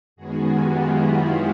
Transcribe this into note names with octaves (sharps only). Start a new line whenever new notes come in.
F#2 D#3 G#3 B3 F#4 G#4
F4 G4
E4 F#4